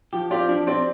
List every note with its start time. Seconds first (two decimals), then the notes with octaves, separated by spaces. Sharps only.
0.13 F3 G4
0.31 C4 F4 G4 D5
0.49 F3 D4
0.67 C4 G4 D5